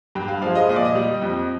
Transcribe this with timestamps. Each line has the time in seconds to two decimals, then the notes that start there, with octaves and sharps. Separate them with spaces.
0.15 G2 G5
0.28 F5
0.42 F3 G#3 F5
0.55 D#5
0.69 A#2 D#5
0.76 D5
0.85 D#5
0.95 G3
1.22 F2